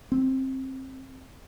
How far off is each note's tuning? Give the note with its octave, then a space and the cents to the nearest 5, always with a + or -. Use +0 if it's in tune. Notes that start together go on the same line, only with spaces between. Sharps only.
C4 +20